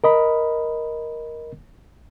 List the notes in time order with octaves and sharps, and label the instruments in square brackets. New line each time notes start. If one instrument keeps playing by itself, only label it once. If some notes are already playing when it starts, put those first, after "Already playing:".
[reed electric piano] A#4 D#5 B5